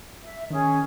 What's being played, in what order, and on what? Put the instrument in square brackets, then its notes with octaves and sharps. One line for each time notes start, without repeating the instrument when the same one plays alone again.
[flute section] E5
[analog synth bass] D#3 [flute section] C#4 G#4